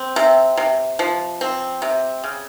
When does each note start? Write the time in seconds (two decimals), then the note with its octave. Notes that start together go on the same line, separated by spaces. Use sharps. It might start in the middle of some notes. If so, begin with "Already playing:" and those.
Already playing: C4
0.16 C3
0.57 C3
0.99 F3
1.41 C4
1.82 C3
2.24 C#3